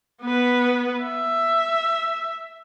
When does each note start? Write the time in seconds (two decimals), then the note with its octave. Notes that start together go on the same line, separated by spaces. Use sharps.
0.22 B3 B4
1.03 E5